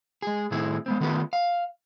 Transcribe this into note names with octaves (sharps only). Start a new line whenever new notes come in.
G#3 G#4
A2 D#3 A3 C4 E4 G#4
G#3 B3 C4
D#3 A3 B3 F4 B4
F5